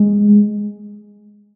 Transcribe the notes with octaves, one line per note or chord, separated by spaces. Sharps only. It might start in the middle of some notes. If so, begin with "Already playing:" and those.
Already playing: G#3